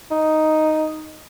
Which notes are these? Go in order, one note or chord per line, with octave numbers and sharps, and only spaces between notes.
D#4